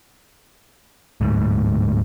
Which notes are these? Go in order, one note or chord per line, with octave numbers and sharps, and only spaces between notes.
D1 D2 G#2